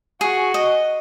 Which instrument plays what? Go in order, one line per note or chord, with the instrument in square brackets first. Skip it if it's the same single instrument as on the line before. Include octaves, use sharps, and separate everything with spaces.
[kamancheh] F#4 [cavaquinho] G#4
[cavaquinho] D#5